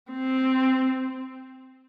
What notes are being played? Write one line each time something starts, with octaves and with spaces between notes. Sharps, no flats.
C4